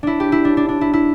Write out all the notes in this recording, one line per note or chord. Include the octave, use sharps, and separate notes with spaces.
D4 E4
G4
E4
D4
D4
D4
E4
E4